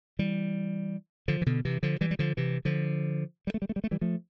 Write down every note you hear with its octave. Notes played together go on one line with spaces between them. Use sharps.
E3 G3
D3 F3
E3
B2 D3
C3 E3
D3 F3
E3 G3
G3
D3 F3
C3 E3
D3 F3
G3
A3
G3
A3
G3
A3
E3 G3
F3 A3